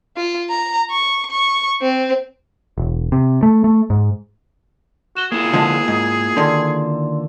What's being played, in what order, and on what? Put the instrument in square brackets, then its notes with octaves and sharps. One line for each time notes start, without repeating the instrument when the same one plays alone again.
[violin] F4
A#5
C#6
C#6
C4
[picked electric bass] E1
C3
A3
A3
G#2
[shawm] F#4 [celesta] E7 G7
[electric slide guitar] A#3 E4 F4 [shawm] G#4
[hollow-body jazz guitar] D3 F3 G#3
G#2
[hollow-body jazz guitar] D3 D#3 [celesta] D5 C6